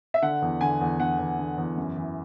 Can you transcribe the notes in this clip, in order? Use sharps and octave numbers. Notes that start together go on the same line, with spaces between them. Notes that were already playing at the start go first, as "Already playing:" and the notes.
E5
D3 F#5
E2
D3 G#5
E2
D3 F#5
E2
D3
E2
F#2
E3